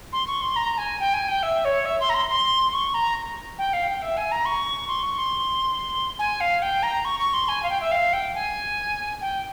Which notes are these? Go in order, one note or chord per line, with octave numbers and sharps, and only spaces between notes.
C6
C#6
C6
A#5
G#5
G5
G#5
G5
E5
C#5
E5
C6
A#5
C6
C6
C#6
A#5
G5
F5
G5
E5
G#5
A#5
C#6
C6
C#6
C6
G#5
F5
G5
A#5
C#6
C#6
C6
G#5
F5
G5
E5
F5
G5
G#5
G5